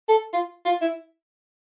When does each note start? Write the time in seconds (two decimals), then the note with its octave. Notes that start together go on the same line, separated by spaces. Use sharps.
0.09 A4
0.33 F4
0.65 F4
0.81 E4